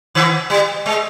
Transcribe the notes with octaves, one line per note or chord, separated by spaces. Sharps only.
D#3
G3
G#3